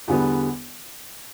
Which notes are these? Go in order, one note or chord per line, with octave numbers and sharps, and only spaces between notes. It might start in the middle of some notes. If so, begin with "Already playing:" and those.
E2 D3 G3 B3